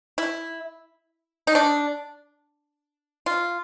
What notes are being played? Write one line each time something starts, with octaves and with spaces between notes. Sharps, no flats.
E4
D#4
D4
F4